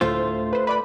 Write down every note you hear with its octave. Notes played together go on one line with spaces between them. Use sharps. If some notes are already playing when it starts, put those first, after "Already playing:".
D2 A2 A3 F4 C5
B4 C5
B4 D5 B5